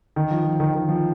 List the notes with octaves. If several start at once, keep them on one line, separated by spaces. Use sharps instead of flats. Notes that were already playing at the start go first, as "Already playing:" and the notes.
D#3
F3
F3
D#3
D#3
F3